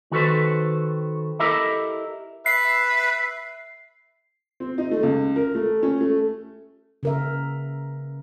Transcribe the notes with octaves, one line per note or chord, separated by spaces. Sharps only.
D#3 F#4 A4 B4 C5
E4 G4 A4 A#4 D#5 E5
B4 E5 C7
C4
D#4
A3
C#2
A#4
A3
C#4
A3
C#3 A#4 E5